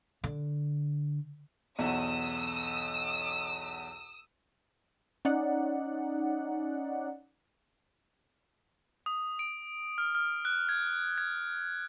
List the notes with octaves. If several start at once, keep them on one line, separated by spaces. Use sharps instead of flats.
D3
B1 E2 D#6 E6
C#4 D#4 D5 F#5
D#6
D7
F6
F6
F#6
G#6
G#6